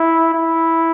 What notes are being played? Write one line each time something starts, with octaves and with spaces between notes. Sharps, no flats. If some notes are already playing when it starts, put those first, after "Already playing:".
Already playing: E4
E4